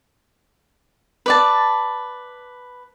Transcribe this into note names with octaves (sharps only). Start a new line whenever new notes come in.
B4 D5 A5